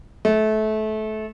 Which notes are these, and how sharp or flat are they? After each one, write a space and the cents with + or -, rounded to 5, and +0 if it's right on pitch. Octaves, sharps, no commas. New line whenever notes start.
A3 -25